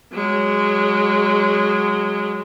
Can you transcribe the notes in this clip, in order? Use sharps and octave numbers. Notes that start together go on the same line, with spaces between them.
F#3 G#3